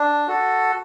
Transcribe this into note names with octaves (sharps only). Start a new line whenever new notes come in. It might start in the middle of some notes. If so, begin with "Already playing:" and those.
Already playing: D4
F#4 A4